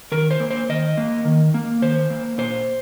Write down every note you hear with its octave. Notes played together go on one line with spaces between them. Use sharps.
D#3 A#4
C5
A#3
C5
D#3 D#5
A#3
D#3
A#3
D#3 C5
A#3
A#2 C5